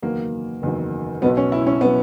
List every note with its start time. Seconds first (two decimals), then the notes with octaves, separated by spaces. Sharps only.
0.02 F#1 E2 D#3 F#3 A#3
0.62 F#1 E2 D#3 F#3
1.22 B1 B2 F#3 B3
1.37 C#4
1.52 E4
1.67 C#4
1.81 B2 F#3 B3